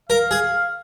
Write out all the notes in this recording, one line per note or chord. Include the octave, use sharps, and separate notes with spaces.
A#4 F5
G#4